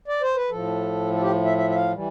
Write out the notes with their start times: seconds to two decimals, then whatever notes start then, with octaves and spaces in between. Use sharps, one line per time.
0.08 D5
0.22 C5
0.36 B4
0.50 A2 F3 A4
1.13 A4
1.21 G4
1.45 E5
1.57 E5
1.70 E5
1.75 F5
1.93 E3 G3